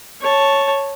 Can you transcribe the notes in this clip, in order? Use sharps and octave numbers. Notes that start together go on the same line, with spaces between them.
C#5 A5